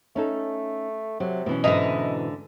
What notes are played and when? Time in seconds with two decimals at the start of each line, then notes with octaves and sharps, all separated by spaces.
0.16 A3 C#4 D#4 A4
1.20 C3 F#3
1.46 B2 E3 C#4
1.64 G#2 D3 E4 B4 D#5 A#5